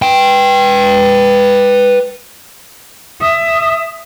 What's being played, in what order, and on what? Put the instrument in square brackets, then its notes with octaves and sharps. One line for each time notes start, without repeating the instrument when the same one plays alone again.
[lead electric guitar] B4 G5
[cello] E5 [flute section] D#6